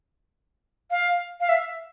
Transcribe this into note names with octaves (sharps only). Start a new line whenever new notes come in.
F5
F5
E5